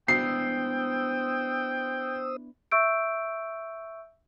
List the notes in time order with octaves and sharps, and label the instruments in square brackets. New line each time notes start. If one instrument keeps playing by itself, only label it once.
[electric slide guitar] B3 D4 E4 [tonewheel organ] C5 D#6 E6 [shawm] G5 [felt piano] C7
[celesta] E5 C#6 E6 G6 D7